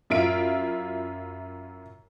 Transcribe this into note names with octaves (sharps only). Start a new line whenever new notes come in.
F#2 E4 F4 D7